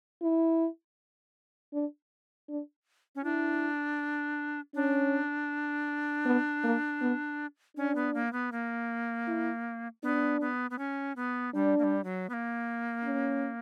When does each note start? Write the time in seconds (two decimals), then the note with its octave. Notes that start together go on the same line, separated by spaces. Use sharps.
0.22 E4
1.73 D4
2.49 D4
3.15 C#4
3.24 D4 E4
4.75 C#4 D4
6.26 B3
6.64 A#3
7.01 B3
7.77 C#4 D4
7.96 B3
8.14 A#3
8.33 B3
8.52 A#3
9.27 E4
10.03 B3 D4
10.41 B3
10.71 B3
10.79 C#4
11.16 B3
11.54 G3 D4
11.79 A#3
11.83 G3
12.04 F#3
12.30 B3
12.33 A#3
13.04 C#4